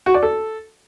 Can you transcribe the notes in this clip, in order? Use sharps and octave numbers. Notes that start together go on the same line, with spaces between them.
F#4
D5
A4